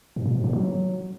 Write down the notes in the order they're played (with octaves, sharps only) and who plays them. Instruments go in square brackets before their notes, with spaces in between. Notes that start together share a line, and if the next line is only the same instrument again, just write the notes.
[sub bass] G#2
A#2
G#2
D3
F#3